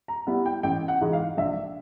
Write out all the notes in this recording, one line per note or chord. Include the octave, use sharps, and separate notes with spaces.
A#5
G3 B3 E4
G5
A1 G5
F#5
G#2 E3 G#3
F5
A#1 E5